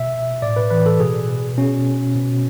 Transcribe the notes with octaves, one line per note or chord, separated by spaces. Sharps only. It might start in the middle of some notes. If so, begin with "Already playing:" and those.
Already playing: B2 E5
A2 D5
B4
E3 B4
A4
B2 G#4
B2 C#4
B2